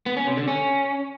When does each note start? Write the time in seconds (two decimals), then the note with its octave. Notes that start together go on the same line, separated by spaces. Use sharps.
0.06 B3
0.17 C#4
0.27 C3
0.37 D3
0.48 C#4